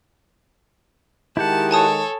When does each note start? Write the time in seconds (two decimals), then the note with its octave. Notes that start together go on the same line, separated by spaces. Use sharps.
1.37 D#3 G#3 E4 G4 F#5 A5
1.71 A4 C#5 G#5 A5 D#6